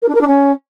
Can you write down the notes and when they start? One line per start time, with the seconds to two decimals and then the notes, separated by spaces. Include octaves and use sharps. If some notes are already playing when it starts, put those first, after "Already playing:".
0.02 A#4
0.08 D4
0.14 A#4
0.20 D4
0.27 C#4